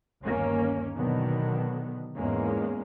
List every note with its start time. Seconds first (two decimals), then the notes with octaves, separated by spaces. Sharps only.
0.22 G1 D#2 A#3 C#4
0.94 B2 D3 D#3 F#3 B3
2.15 E2 G#2 G#3 A#3 C#4